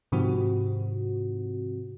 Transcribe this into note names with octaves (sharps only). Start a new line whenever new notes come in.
G#2 C3 D#3 F3 C4 F#4